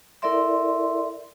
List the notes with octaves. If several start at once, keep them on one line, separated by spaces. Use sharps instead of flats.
E4 A4 A#4 D5 E5 C6